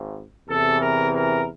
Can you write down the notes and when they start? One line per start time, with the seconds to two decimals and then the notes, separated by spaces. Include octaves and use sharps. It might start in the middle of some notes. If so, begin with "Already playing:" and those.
Already playing: G#1
0.49 E2 C3 E3 A4
0.80 A#4
1.12 A#4